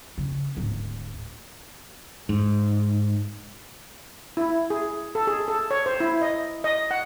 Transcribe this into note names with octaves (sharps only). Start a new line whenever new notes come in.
C#3
D1 G#2
G#2
E4
G#4
A4
G#4
A4
C#5
C5
E4
D#5
D#5
F#5